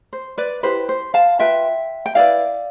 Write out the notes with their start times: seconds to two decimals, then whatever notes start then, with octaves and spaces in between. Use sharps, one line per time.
0.13 C5
0.38 B4 D5
0.63 E4 G4 B4 C5
0.89 C5
1.14 F5 A5
1.39 F4 B4 E5 G5
2.06 G5
2.15 E4 B4 D5 F5